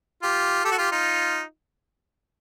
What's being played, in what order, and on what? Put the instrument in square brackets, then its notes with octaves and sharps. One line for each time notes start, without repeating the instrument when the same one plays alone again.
[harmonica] F4 G4
G4 A4
F#4
F4 G4
D#4 F4